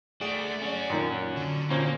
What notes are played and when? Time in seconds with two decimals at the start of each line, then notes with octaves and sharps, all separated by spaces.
0.21 A3 F#4 G#4 D5
0.61 C#4 F#4
0.90 F#2 A#2 D#3
1.36 D3
1.70 A#2 A#3 C#4 C5